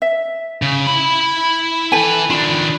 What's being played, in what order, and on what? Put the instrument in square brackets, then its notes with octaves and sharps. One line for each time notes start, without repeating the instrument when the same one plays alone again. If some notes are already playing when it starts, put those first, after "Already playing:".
[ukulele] E5
[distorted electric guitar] C#3
E4 B5
[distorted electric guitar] E3 B4 [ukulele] A4 G5 G#5
[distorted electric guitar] D#3 D4 [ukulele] F4 B5